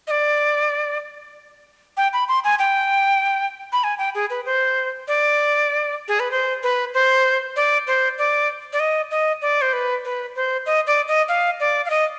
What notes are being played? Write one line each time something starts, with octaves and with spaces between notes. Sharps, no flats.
D#5
D5
G5
B5
C6
G#5
G5
B5
G#5
G5
G#4
B4
C5
D5
G#4
B4
C5
B4
C5
D5
C5
D5
D5
D#5
D#5
D5
C5
B4
B4
C5
D#5
D5
D#5
F5
D5
F5
D#5